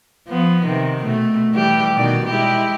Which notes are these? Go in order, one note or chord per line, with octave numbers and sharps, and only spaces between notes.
F3 B3
C3 D#3
B2 A3
E3 G3 G4
B2 D#3 D5
G#3 E4 G4